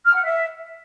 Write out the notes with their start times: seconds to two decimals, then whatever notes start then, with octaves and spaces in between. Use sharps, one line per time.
0.04 F6
0.14 F#5
0.23 E5